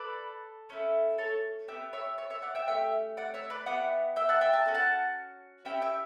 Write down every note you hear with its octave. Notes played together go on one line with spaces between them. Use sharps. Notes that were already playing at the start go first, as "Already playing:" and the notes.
Already playing: A4 B4 D5
A3 C#4 E4 A4
A4 C#5
B3 E4 G4 E5 G5
C#5 E5
C#5 E5
C#5 E5
D5 F#5
E5 G5
A3 C#4 G4 E5 G5
D5 F#5
C#5 E5
B4 D5
B3 E4 G4 D5 F#5
E5 G5
F#5 A5
E5 G5
A5
C#4 F#4 A4
F#5 A5
C#4 E4 G4 E5 G5
E5 G5